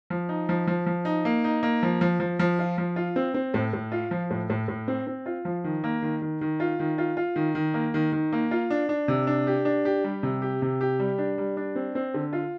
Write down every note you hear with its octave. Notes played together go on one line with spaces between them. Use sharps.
F3
D#4
F3
F3
F3
D#4
A#3
D#4
A#3
F3
F3
F3
F3
F4
F3
F4
C4
C4
A2
A2
F4
F3
A2
A2
A2
C4
C4
F4
F3
D#3
A#3
D#3
D#3
D#3
F4
D#3
F4
F4
D#3
D#3
A#3
D#3
D#3
A#3
F4
D4
D4
C3
D4
G4
D4
G4
G3
C3
G4
C3
G4
G3
D4
G3
D4
C4
C4
D3
F4